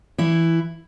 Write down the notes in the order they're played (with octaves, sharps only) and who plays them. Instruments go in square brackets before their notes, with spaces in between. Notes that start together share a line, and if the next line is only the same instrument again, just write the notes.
[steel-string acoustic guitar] E3 E4